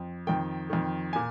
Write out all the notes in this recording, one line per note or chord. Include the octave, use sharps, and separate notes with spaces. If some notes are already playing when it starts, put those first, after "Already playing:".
Already playing: F2
F2 D#3 G5
F2 D#3
A#2 G#5